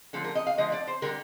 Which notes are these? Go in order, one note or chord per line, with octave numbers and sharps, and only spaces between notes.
D3 F3 A3 A4
A#4
D#5
F5
D3 F3 A3 D#5
D5
C5
D3 G3 A#4